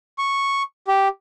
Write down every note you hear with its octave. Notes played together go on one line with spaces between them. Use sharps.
C#6
G4